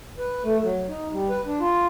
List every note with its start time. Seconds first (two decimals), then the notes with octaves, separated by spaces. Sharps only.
0.18 B4
0.43 A3
0.63 F#3
0.89 D#4
1.12 G3
1.30 B4
1.46 D4
1.60 F4